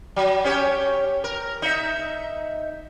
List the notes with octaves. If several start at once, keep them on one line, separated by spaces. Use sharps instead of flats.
F#3
C#4 G4 C#5
A#4
D#4 E5